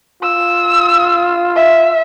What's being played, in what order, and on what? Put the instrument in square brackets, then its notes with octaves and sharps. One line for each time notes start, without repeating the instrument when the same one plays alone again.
[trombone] F4 [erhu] E6
[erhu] E5